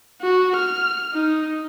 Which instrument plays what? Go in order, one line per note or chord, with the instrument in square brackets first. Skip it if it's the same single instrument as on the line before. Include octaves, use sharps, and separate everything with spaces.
[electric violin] F#4
F6
D#4